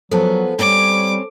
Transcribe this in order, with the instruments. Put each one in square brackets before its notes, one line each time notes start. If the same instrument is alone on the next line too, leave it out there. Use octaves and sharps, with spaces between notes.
[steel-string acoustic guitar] F3 G#3 B3 [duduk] F#3 [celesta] A4 C5 A5
[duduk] G3 [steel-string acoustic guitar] C4 C#4 C#5 [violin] D6